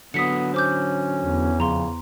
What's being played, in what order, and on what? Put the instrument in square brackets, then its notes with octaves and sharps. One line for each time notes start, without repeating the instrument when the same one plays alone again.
[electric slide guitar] D3 F#3 [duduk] B3 [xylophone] D#6 B6 C#7
[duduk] C#4 [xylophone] C5 D6 G6
[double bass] E2
[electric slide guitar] F2 [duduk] C#3 [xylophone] A#5 C6